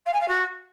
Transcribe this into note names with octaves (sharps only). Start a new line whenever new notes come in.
F5
G#5
F5
F#4